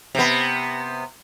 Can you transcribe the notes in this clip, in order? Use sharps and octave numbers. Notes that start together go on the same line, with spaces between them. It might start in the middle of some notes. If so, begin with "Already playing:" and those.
C3 B3